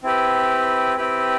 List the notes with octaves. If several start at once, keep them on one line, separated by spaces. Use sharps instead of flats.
C4 E4 G4 B4
C4 E4 G4 B4